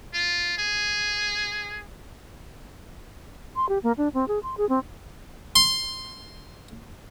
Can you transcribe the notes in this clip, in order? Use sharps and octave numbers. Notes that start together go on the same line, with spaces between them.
F4
G#4
C6
G4
A#3
D4
C4
G#4
C6
G#4
C4
C6